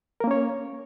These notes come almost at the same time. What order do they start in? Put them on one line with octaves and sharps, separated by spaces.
A#4 A#3 C#4 C#5